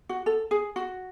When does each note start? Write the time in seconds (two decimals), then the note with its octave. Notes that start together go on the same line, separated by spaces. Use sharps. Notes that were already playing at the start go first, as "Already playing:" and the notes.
0.09 F#4
0.26 A4
0.51 G#4
0.76 F#4